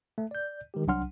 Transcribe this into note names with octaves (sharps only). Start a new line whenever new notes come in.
A3
D5 G6
D#3 G#3 G4
C2 F#3 D4 F#5 C6 F6